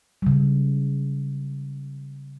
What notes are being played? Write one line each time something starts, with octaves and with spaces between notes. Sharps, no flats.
C#3 G3